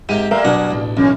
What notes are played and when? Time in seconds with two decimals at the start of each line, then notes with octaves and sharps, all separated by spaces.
0.09 G#2 C3 A#3 G4 D#7
0.31 G3 A3 A#3 A#4 E5 F5
0.44 B2 F#3 D4 F#5 G#5
0.71 A1
0.97 B1 E3 A#3 C#4